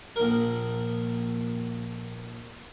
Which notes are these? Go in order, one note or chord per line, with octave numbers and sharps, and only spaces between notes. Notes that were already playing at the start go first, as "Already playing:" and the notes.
A#1 A#4